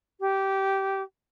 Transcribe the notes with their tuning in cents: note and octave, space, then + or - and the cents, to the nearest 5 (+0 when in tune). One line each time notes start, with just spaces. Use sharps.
G4 -15